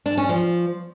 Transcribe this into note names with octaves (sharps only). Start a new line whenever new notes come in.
D4
C#4
F3